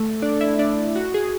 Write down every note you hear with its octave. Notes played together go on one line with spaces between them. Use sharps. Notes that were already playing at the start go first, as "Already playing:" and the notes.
Already playing: A3 A4
D4 D5
E4 E5
D4 D5
F#4
G#4